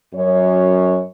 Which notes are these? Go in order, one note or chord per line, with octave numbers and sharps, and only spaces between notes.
F#2 C#5